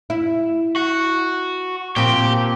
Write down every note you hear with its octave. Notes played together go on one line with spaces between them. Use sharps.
E4
F#4
A#2 F3 C4 G4